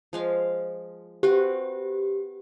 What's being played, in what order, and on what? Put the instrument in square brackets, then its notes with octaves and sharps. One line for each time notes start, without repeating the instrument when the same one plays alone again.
[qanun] F3 G#3 F5
[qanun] C4 F#4 B4 [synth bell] G4